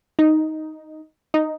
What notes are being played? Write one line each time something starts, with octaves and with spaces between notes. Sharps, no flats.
D#4
D#4